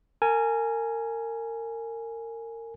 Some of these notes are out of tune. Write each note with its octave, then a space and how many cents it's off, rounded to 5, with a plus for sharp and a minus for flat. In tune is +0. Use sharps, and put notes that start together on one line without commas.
A#4 -30 G#5 +5